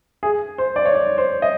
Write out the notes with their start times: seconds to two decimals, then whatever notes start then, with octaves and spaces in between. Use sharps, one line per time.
0.23 G#4
0.58 C5
0.76 D5
0.86 C#5
0.94 D5
1.18 C5
1.42 D#5